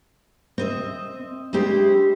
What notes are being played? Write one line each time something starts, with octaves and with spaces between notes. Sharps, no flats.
C4 D#5 E5
G#3 D4 E4 G4 C5